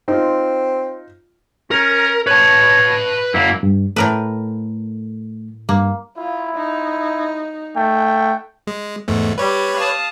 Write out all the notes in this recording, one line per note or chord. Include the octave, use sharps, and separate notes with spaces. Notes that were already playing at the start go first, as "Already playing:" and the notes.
C4 D#4 F4
C#4 A#4
B4 C#5 A5
F#2 A#3 E4
G2
A2 A3 A#4 B4
G2 A#3
E4 F4
D#4
A3 G5
G#3
E2 G#2 A3
G3 B4 C#5
F5 A5 D#6